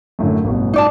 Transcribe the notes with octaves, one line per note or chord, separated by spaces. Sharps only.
F#2 A2 D3
A1 G2 B2
D#4 D5 A5